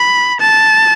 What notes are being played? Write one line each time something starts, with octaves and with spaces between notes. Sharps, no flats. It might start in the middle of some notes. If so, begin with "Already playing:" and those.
Already playing: B5
A5